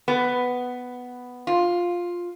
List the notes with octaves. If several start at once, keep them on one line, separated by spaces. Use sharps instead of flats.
B3
F4